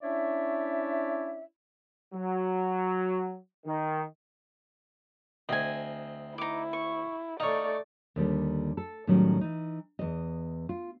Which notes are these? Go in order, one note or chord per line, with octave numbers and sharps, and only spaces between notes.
C#4 D4 E4 C#5 D5 E5
F#3
D#3
D2 C4 D#5 G#5
D#4 E4 D6
C#6
A3 D#4 C#5 D5 F5
D#2 D3 G3
A4
A2 D#3 F#3 G3 C#4
E3 D#4
E2 D#5
F4